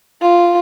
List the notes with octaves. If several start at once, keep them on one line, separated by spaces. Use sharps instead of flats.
F4